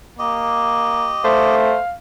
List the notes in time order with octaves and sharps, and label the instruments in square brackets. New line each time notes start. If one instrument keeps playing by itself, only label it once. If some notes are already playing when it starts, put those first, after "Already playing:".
[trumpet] A#3 [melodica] G4 D#5
[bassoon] A3 [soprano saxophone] C5 [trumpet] F5